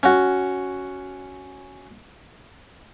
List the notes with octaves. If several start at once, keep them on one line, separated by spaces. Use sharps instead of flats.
C#4 F#4